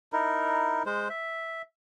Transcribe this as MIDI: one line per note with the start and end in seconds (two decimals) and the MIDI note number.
0.13 0.83 63
0.13 0.83 64
0.13 0.83 70
0.86 1.08 56
0.86 1.08 72
1.10 1.62 76